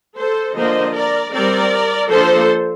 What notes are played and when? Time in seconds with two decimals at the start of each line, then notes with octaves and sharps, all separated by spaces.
0.18 A4 C5
0.57 D3 F3 A#3 D4 C5 D#5
0.96 A#4 D5
1.34 G3 C4 A#4 D5
2.11 F3 A#3 D4 A4 C5